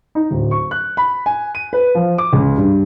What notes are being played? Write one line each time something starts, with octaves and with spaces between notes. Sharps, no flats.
D#4
D1
C#6
F#6
B5
G#5
D#7
B4
F3
D6
C#2
G2